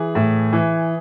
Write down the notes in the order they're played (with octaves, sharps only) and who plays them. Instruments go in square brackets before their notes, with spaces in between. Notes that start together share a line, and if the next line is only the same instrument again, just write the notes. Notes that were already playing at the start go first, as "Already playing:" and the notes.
Already playing: [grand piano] E3 G#4
A2
E3